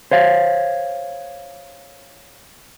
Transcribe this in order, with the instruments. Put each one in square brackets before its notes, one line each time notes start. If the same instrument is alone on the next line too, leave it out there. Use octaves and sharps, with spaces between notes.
[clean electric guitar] C5 C#5 F5